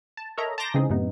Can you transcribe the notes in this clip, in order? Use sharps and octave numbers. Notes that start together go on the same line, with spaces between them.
A5
A4 A#4 C#5 D#5 E5 A#5
A5 A#5 C6 D6 G6 A#6
C#3 E3 G#3 C4 D#4 G#4
F#2 A2 C3 B3 D#4